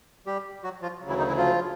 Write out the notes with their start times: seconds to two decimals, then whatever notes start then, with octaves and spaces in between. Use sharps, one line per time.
0.26 G3 G4
0.64 F#3 F#4
0.82 F3 F4
1.01 D2 C#3 F#3
1.10 E3 E4
1.18 D#3 D#4
1.28 E3 E4
1.37 F3 F4